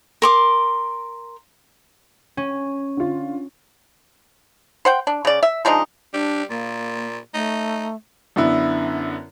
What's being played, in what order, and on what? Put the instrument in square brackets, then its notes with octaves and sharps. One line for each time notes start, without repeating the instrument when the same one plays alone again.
[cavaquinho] A#4 C6 D6
[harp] C#4
[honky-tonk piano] D3 F4
[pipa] C5 F#5 G5
D4
C#3 D5
E5
F3 G#3 D4 D#4
[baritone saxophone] G3 [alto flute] D4
[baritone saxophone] A#2 [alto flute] A#3
[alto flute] A3 [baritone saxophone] D#4
[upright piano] F#2 D3 B3 E4